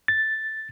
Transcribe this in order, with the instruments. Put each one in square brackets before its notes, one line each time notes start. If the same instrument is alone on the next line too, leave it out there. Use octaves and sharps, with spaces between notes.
[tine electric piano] A6